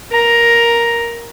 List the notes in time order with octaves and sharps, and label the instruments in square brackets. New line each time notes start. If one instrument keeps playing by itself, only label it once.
[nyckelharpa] A#4 A#5